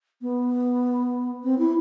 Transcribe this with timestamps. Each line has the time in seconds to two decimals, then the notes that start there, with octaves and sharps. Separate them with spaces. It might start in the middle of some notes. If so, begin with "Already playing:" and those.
0.22 B3
1.44 C4
1.59 E4